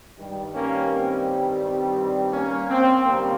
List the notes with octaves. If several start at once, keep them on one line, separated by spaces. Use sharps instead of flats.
G2 D#3 G3
A#3 C#4
C4
C4
A#3 C#4
C4
D#2 C#3 G3 A#3